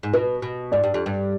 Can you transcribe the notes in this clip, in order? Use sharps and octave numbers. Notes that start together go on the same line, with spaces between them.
G#2
B2 B4
B2
G#2 D5
G2
F2
G2